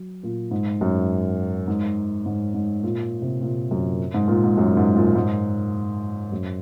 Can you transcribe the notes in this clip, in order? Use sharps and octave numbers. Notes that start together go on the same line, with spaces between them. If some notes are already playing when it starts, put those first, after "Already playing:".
Already playing: F#3
A#2
G#2
F#2
G#2
G#2
G#2
A#2
C3
A#2
F#2
G#2
A#2
G#2
F#2
G#2
A#2
G#2
F#2